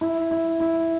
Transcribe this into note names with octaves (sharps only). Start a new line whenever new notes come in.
E4
E4
E4